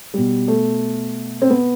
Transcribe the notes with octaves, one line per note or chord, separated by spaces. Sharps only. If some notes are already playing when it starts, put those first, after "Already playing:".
B2 G3
A3
C4
B3